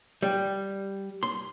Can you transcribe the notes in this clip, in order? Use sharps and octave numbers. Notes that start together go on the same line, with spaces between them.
G3
C6